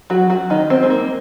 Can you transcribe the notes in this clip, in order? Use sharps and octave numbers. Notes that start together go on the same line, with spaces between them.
F#3 F#4
F#3 F#4
D#3 D#4
C4
G#3
A#3